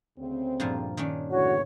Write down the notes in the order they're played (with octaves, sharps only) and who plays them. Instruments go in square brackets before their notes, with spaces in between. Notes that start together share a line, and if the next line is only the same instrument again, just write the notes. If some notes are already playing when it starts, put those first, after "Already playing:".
[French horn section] D2 C#3 C4
[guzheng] G2 A#2 F3
D#3 C#4 D4
[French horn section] E2 A2 D3 [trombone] F#4 [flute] C#5